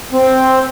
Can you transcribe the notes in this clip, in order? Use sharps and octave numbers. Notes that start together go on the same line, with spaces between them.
C4